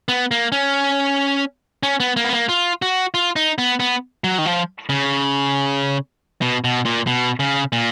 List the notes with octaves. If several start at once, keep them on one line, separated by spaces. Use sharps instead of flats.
B3
A#3
C#4
C#4
B3
A#3
B3
A#3
F4
F#4
F4
D#4
B3
B3
F#3
D#3
F3
C#3
B2
B2
A#2
B2
C#3
A#2